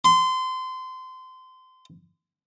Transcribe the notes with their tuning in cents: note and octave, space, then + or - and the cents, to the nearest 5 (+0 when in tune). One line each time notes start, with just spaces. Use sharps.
C6 -25